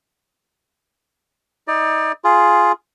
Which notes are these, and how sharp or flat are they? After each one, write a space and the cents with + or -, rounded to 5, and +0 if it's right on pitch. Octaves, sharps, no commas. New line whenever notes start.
D#4 +30 D5 +30
F4 +0 G#4 +5